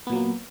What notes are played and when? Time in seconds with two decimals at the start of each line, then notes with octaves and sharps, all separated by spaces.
0.07 B3
0.10 A#2
0.12 F#3
0.15 A#3